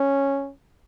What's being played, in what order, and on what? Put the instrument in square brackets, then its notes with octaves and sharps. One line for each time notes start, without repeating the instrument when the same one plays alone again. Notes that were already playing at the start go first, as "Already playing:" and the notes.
Already playing: [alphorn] C#4